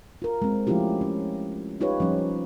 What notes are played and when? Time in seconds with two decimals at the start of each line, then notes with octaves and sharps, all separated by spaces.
0.22 F4 A#4
0.42 G#3 C4
0.67 F3 A3 C#4 E4 F4 G4
1.01 C#4
1.81 D#4 F4 G4 B4 C#5
2.00 F3 G3 C#4